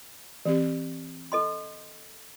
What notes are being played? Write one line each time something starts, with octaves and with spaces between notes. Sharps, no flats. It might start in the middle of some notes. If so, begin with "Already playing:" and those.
E3 C4 G4
A4 D#5 C6